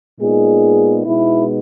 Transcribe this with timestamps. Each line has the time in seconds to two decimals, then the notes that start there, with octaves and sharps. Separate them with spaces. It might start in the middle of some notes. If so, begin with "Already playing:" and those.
0.20 A#2 G#3 B3 D#4 G#4
1.05 B2 G#3 B3 D#4 E4